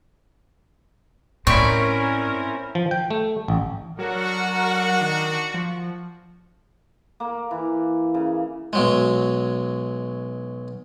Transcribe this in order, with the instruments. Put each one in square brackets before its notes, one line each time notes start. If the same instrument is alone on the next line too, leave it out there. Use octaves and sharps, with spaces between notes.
[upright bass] A2 [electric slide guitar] C4 E4 [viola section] C#4 A#4 [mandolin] D5 C#6
[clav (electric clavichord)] F3
G5
A3
A1
[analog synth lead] F#3 [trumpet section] D4 F#4 [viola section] A#4 F#5
[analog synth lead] D#3
F3
[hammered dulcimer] A#3
E3
C#3
[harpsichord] B1 F#3 G#3